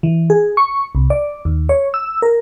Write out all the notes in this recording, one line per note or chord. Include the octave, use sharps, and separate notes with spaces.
E3
G#4
C#6
C2
D5
D#2
C#5
E6
A#4